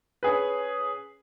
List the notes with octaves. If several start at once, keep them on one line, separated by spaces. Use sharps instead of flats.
C#4 G#4 B4